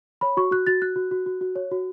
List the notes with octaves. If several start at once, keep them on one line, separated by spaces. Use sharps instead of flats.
C#5 B5
F#4 C#6
F#4 F#6
F#4 A6
F#4 F#6
F#4
F#4
F#4
F#4
C#5
F#4